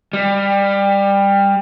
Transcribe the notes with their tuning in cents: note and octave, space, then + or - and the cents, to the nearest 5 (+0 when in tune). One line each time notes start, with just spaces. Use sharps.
G3 +20